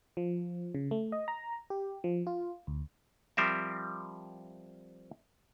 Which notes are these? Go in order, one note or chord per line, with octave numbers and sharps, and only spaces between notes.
F3
C#3
A3
D#5
A#5
G4
F3
F4
D2
F3 G3 C4 A#4 E5